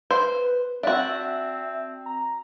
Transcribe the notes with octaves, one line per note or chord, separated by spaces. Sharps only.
B4 C5
C4 D4 F#4 E5
A#5